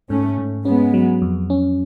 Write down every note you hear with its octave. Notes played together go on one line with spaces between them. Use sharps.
G#2 A3 C#4
G#2
G#3 B3 C#4
F#3
F2
C#4